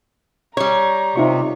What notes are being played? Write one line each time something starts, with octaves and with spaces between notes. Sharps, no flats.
G3 C#5 A#5
C3 D#4 F4 C#6